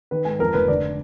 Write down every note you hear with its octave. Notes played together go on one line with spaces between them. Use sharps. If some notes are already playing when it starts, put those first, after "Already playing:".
D#3 B4
G#2 G#5
F2 A#4
F1 B4
D3 D5